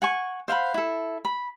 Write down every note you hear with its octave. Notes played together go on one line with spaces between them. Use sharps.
F#5 G#5 C#6
C5 F5 F#5 B5
E4 A4
B5